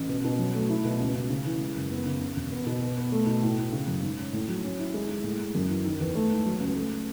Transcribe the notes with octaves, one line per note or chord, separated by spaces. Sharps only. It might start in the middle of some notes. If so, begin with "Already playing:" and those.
Already playing: A1
B2
B2
F#3
A3
E4
B2
C#2
C#2
C#3
E3
G#3
F#1
B3
C#3
C#3
E1
B3
B2
B2
B3
A3
B2
A2
A2
C#3
F#2
G#2
C#4
A2
F#3
C#4
E4
G#3
G#3
A2
A2
F#2
E3
D#3
E2
A3
G#2
F#3
C#2
A3